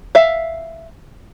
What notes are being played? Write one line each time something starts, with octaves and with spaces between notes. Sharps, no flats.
E5 F5